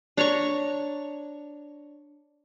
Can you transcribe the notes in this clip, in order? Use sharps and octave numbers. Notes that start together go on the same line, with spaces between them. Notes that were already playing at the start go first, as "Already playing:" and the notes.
D4 C#5 A#5 C#6